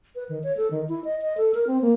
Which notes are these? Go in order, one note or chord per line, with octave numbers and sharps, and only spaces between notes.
B4
D#3
C#5
A4
D#3
E4
D#5
D#5
A4
A#4
C4
A#3